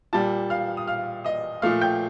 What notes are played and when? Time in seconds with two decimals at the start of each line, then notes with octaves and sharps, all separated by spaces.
0.13 A#2 G3 A5 A6
0.50 F5 F6
0.77 D#6
0.88 F5 F6
1.25 D#5 D#6
1.62 A#2 F3 A3 F5 F6
1.81 G5 G6